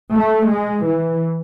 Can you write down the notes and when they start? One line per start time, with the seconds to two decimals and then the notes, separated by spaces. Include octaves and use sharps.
0.13 A3
0.49 G#3
0.85 E3